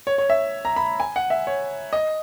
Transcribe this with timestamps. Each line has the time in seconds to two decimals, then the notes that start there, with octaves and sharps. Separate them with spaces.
0.07 C#5
0.18 C#5
0.30 E5
0.65 A#5
0.76 B5
1.00 G#5
1.16 F#5
1.30 E5
1.47 C#5
1.93 D#5